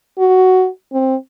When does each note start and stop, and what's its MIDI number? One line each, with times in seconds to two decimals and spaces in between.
0.19 0.68 66
0.93 1.15 60